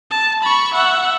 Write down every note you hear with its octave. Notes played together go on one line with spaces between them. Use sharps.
A5
B5 C#6
E5 F#5